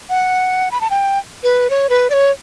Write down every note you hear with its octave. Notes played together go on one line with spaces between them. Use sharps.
F#5
B5
A5
G5
B4
C#5
B4
D5
C#5